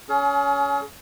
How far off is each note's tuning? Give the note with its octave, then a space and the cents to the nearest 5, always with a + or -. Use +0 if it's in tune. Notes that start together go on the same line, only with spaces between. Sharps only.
C#4 +20 G#4 +40